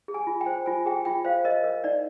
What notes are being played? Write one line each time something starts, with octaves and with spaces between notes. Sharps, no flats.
G#4
G#5
F4
G5
C5
F4 G#5
G#4 G5
F4 G5
C5 F5
A#4 D#5
A#4
D#4 D5